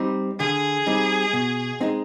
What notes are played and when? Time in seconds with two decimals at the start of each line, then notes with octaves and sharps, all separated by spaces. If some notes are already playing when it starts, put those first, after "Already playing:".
Already playing: G3 C4 D#4
0.39 D3 G#4
0.87 G3 C4 D#4
1.33 B2
1.81 G#3 C4 D#4